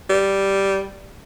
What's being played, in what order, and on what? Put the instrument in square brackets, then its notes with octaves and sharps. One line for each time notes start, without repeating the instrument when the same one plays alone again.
[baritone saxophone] G3